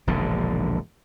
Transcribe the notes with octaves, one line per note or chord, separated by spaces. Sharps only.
E1 A#1 G#2 D3